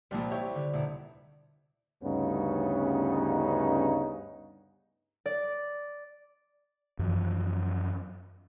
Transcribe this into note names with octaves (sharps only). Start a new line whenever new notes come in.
C2 A#2 F3 G3
E4 G4 C#5
D3
D#1 B2 E4
D2 G2 C#3 B3 C#4 D#4
D5
F#2 E3 F3